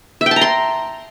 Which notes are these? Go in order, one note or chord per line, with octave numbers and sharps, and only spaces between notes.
E5
G5
A5
A#5
C6